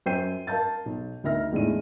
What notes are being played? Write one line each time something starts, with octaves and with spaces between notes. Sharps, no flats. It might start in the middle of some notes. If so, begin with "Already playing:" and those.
F#2 C5 G5 G6 C7 D#7
A#4 F5 A5 G6 A6
B1
D2 D#4 A#4 E5 F6 A#6
E2 A2 G#3 D4 D#4 D#7